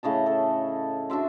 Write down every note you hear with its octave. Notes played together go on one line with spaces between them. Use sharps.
A2 C#3 D#5 A5
A4
D4 F#4 E5 C6